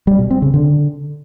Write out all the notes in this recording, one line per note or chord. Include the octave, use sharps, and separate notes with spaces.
G3
B2
C4
C#3
D3